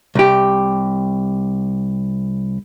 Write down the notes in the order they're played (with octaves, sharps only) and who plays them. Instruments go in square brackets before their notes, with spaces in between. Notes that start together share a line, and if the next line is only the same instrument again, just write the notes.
[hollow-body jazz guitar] C2 G4